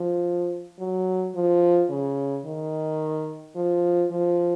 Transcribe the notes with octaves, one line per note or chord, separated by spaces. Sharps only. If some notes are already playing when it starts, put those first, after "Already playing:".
Already playing: F3
F#3
F3
C#3
D#3
F3
F3